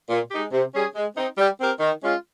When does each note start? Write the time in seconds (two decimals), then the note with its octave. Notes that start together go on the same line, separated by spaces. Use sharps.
0.10 A#2
0.31 G#3 D#4 G4
0.53 C3
0.74 G3 C#4 G#4 C#5
0.95 G#3
1.16 C4 D#4
1.38 G3
1.59 C4 G4 A#4
1.80 D#3
2.02 G#3 C#4 F4